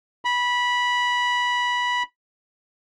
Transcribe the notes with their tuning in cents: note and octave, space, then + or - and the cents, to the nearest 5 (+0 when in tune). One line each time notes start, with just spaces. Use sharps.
B5 -15